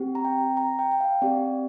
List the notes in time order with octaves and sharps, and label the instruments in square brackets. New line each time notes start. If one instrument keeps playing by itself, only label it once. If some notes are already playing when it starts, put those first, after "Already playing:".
Already playing: [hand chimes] C4 G4
A#5
G5
A#5
G5
G5
F5
C4 G4 D5